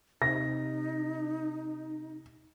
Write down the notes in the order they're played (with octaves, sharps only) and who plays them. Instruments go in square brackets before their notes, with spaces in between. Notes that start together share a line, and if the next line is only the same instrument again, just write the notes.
[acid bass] C3 [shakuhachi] D#4 [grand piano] A#6